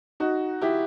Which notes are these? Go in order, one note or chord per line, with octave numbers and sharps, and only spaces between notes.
D#4 F#4
E4 G4